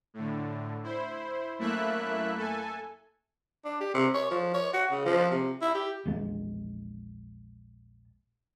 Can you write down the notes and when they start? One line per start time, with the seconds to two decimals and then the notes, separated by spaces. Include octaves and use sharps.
0.14 A2 D3
0.83 E4 C5
1.58 F#2 A3 A#3 E4 E5 F#6
2.37 A4 G#5
3.65 D4
3.80 G4
3.94 C3
4.14 C#5
4.31 F3
4.54 C#5
4.73 F#4
4.91 C#3
5.05 F3
5.31 C3
5.62 E4
5.75 G4
6.06 A#1 E2 G#3